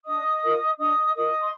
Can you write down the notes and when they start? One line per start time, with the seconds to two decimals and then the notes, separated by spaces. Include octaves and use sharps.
0.06 D4 D#5 D#6
0.43 F4 A#4
0.78 D4 D#5 D#6
1.15 F4 A#4 D#5 D#6
1.41 C6